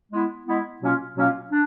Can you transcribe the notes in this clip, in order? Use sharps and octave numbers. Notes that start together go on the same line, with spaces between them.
G#3 B3 E4
G#3 B3 E4
B2 F#3 A#3 C#4 F4
B2 F#3 A#3 C#4 F4
D4